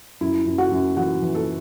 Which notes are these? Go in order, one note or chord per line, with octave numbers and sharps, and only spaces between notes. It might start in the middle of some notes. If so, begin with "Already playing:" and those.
F#2 E4
F#2
F#4
F#2
E3 F#4
E3
A4